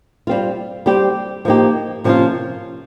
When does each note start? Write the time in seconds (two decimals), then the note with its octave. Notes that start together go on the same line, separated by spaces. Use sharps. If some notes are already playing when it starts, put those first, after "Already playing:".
0.27 G3 C4 F4
0.86 G3 C4 G4
1.45 F3 A#3 D#4 G4
2.04 C3 F3 A#3 C#4 F4